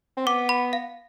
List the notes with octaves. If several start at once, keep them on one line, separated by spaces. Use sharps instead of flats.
C4
B3 D6
B5
F5